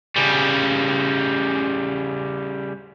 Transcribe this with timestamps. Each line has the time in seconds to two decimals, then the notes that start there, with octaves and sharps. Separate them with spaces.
0.16 C#3 G3